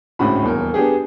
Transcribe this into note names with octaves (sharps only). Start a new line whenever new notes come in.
G#1 D2 A2 C#3 F#4 B5
D#1 E2 A#4
B3 D4 G4 G#4